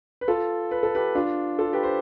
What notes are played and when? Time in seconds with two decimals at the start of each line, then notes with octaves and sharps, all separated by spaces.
0.21 B4
0.28 F4 A4
0.71 B4
0.83 A4
0.95 G4 B4
1.15 D4 F4
1.59 F4 A4
1.73 G4 B4
1.83 C5